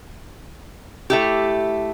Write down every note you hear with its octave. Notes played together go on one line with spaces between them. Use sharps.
A3 E4 G4